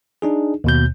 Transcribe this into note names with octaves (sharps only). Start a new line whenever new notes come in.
D4 D#4 G#4
D#2 B2 G6